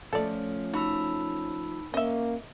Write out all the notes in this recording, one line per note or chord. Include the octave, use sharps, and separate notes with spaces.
F3 A3 C#4 A4 D5
D#4 F#4 B5 E6
A#3 C#4 D#5 E5